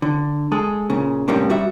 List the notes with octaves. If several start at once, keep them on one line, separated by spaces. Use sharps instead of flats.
D3
G#3 G#4 A4
A#2 C#3
A2 C3 G3 A#3 C#4 D4
G3 F#4 E5